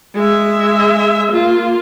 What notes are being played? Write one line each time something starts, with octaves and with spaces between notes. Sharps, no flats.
G#3 E5
A#3 F4